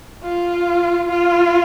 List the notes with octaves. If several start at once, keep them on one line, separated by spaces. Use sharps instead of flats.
F4
F4